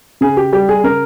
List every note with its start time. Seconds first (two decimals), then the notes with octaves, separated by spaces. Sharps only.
0.21 C#3 G#4
0.37 G4
0.53 G3 G4
0.69 G#4
0.84 C#3 A#4